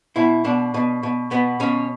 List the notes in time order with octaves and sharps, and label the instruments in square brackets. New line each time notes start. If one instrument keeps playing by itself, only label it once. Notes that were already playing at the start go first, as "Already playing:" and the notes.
[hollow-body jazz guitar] B2 E4
B2 D4
B2
B2
B2 B3
B2 C#4